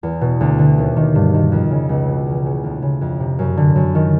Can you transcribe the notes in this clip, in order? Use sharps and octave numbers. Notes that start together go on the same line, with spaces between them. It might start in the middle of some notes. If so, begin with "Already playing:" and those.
E2
B2
D2
D3
D#2
D#3
G2
D#3
F2
C#3
C#2
B2
E2
C#3
D2
C#3
F2
C3
F#2
D3
F#2
D#3